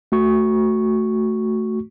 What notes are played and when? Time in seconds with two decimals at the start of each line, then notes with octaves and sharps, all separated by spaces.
0.12 A3 F#4 C#6